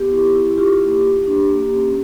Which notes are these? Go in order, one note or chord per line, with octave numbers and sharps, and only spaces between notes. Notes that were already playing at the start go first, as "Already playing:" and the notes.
Already playing: B3 G4
E4
E4
F4 G4
A#3
F4
D4
A#3
C#4